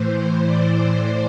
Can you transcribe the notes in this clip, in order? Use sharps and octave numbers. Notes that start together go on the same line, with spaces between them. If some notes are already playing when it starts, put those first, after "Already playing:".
Already playing: A2 E3 C5
C5
D5